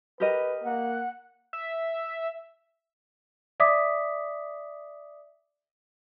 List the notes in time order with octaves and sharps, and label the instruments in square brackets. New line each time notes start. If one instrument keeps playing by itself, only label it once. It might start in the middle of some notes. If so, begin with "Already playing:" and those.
[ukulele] G4 A#4 D#5 [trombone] B4
[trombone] A#3 [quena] F#5
[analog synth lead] E5
[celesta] D5 E5 D6 D#6 B6